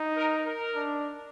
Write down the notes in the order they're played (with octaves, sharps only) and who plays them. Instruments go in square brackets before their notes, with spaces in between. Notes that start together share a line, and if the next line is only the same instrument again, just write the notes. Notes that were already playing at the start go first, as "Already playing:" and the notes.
Already playing: [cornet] D#4
[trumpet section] A#4
A#4
[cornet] D4